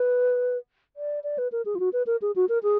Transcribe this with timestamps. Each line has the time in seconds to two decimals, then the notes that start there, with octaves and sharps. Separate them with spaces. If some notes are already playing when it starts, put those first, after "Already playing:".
Already playing: B4
0.96 D5
1.23 D5
1.38 B4
1.52 A#4
1.65 G#4
1.75 F4
1.79 F#4
1.93 B4
2.07 A#4
2.22 G#4
2.36 F#4
2.49 A#4
2.63 G#4